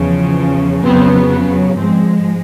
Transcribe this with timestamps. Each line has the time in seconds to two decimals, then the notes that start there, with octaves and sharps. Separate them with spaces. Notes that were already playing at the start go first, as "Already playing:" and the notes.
Already playing: E2 C#3 F3
0.83 F2 C#3 F#3 B3 C4
1.30 B3
1.77 G#2 F3 G#3 C4